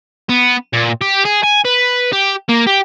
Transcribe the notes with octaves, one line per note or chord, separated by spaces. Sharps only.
B3
A#2
G4
G#4
G#5
B4
G4
A#3
G4